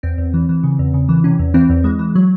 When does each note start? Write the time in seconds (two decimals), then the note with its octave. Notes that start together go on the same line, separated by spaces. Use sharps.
0.03 E2 C4
0.18 E2
0.34 E3
0.49 E3
0.64 C#3
0.79 E2
0.94 C#3
1.09 E3
1.24 C3 C#4
1.39 E2
1.54 E3 C4
1.69 E2
1.84 E3 G#3
1.99 E3
2.15 F#3